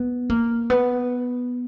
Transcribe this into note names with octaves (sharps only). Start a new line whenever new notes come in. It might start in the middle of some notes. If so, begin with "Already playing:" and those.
Already playing: B3
A#3
B3